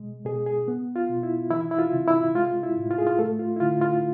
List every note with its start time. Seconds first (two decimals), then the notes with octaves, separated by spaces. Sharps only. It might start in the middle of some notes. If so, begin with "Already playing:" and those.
Already playing: B2 G#3
0.25 B2 G#4
0.46 G#4
0.68 B3
0.96 F4
1.09 B2
1.23 E4
1.51 E3 E4
1.71 E4
1.78 F4
1.93 C3
2.08 E4
2.34 G#3 F4
2.63 E4
2.77 A2
2.91 F4
2.98 G#4
3.07 F4
3.18 A3 A4
3.39 F4
3.56 E4
3.60 D3 F4
3.81 F4